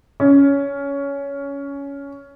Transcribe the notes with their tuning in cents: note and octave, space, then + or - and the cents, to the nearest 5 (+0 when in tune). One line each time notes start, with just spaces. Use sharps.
C#4 +15